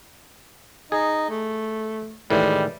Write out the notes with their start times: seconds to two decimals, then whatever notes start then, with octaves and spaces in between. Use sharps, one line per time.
0.92 D#4 G#4
1.29 A3
2.30 A2 D#3 E3 G3 G#3